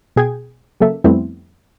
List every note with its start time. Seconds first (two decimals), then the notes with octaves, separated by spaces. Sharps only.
0.16 B2 G#4 G5 G#6
0.80 C#3 F#3 A#3 A4 E5
1.04 F2 G3 A3 B3 C4 E4